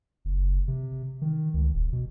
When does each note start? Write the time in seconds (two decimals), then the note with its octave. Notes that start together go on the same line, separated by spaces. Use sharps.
0.25 F#1
0.68 C3
1.21 D#3
1.54 C#2
1.74 D#1
1.93 B2